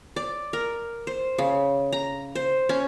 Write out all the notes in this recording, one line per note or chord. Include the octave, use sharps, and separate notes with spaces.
D5
A#4
C5
C#3
A#5
C5
C#4